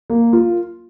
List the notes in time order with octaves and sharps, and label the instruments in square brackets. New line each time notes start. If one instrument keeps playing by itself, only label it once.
[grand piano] A#3
F4